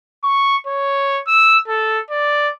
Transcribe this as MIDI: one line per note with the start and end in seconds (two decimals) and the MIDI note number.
0.24 0.57 85
0.66 1.22 73
1.27 1.58 88
1.68 1.99 69
2.10 2.51 74